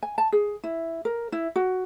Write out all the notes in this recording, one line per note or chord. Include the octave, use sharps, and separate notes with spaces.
G#5
A5
G#4
E4
A#4
E4
F#4